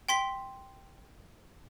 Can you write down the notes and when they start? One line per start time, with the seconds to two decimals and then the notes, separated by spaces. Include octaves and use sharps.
0.09 G5 C6 B6